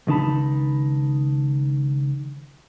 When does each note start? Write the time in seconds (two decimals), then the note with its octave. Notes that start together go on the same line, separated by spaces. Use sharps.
0.07 C#2 D#3 D#4 A5 B5